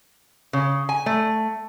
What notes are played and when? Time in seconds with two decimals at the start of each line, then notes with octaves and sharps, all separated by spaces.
0.53 C#3
0.89 G#5
1.06 A3